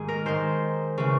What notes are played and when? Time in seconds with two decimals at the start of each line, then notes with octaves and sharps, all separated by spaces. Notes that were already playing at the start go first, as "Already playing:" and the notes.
Already playing: G#2 D#3 G#4
0.08 A#4
0.26 G#2 D#3 C5
0.98 C#3 E3